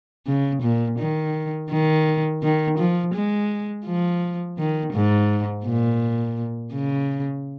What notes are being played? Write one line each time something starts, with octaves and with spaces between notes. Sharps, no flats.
C#3
A#2
D#3
D#3
D#3
F3
G#3
F3
D#3
G#2
A#2
C#3